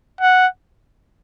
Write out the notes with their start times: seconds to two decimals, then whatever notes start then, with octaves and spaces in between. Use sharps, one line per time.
0.21 F#5